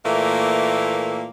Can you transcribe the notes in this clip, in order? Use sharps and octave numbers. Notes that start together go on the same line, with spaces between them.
A#2 E3 A3 A#3